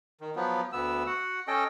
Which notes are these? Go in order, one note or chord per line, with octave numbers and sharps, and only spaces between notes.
D#3
F3 F#3 B3
D2 B3 E6
F#4 F#5
C#4 A4 D#5 G5